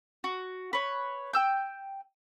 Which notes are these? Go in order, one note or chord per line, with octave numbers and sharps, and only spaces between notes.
F#4
B4 C#5
G5 E6 G6